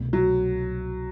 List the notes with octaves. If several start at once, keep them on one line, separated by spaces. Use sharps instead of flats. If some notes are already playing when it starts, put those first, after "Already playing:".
Already playing: C2 B2 A3
F#3